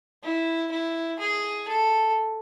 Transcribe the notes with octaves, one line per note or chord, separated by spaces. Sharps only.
E4
E4
G#4
A4